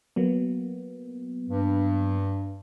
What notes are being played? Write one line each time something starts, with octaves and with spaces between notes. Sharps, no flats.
F#3 A#3 B3
G2